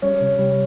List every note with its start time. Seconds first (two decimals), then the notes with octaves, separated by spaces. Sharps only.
0.02 G3 C#4
0.21 C3
0.39 G3